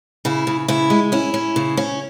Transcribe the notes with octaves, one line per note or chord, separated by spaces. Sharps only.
C#3 E4
C#3
C#3 E4
G#3
C#4 E4
C#4
C#3
C#4